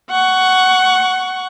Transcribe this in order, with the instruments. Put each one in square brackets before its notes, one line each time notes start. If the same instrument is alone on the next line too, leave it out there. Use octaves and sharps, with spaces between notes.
[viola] F#5 C#6